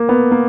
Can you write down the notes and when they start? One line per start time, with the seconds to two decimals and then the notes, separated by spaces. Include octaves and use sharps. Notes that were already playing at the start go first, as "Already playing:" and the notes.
Already playing: A#3
0.09 B3
0.31 A#3